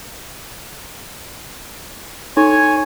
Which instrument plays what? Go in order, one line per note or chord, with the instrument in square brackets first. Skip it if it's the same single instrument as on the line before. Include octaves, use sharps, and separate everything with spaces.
[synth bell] D#4 [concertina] C#5 G#5